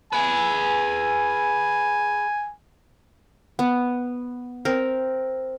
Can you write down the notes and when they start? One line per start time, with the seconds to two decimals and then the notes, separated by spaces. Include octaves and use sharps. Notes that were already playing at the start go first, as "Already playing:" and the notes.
0.13 G#4 B4 G#5
3.59 B3
4.65 C4 A#4